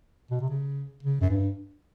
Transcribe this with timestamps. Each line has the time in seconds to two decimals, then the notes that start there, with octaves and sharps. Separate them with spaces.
0.31 B2
0.41 C3
0.49 C#3
1.03 C#3
1.21 F#2
1.30 G2